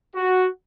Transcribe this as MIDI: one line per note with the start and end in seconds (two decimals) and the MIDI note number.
0.15 0.47 66